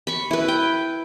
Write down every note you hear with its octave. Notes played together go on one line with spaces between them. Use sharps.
B5 C#6
E4 B4
G5